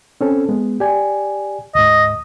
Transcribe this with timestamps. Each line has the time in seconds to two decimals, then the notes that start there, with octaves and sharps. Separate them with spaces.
0.21 C4 C#4 A4
0.49 G#3 B3
0.80 G4 D5 G#5
1.75 D2 G#2 D#5